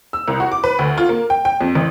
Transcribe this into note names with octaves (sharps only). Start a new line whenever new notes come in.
E6
C2
F#4
D6
B4
D2
F4
A#3
G5
G5
F2
A1